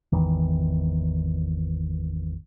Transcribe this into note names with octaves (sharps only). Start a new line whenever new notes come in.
G#1 E2 D#3 E3